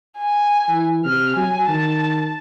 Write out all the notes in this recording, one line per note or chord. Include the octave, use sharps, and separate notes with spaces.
G#5
E3
C3 F6
F#3 G#5
D#3 A5